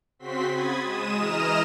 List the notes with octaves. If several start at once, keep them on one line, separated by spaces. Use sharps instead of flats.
C#3 C4 F#4 C6 B6
B5 D#6 G#6 A6
G#3 D#6 D#7 E7
E3 D#5 A#5 D#6 F6 E7